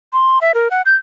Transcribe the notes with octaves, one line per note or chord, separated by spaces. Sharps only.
C6
E5
A#4
F#5
G6